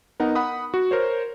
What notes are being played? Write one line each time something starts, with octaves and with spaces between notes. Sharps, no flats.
B3 D#4 A#4 F#5
F#5 B5 D#6
F#4
A#4 C5 C#5